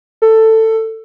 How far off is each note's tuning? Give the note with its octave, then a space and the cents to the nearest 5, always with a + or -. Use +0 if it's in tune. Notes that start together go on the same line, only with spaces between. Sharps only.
A4 +15